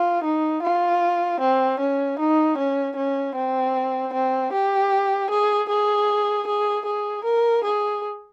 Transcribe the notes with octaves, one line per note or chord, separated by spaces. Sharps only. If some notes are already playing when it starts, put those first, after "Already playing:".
Already playing: F4
D#4
F4
C4
C#4
D#4
C#4
C#4
C4
C4
G4
G#4
G#4
G#4
G#4
A#4
G#4